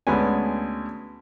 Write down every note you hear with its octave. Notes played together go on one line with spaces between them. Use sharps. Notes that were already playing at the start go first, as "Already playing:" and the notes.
D2 G#3 B3 C#4 G#5